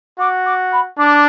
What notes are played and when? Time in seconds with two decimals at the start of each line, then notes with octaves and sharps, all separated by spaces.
0.19 F#4 D6
0.45 D6
0.72 B5
0.98 D4 D6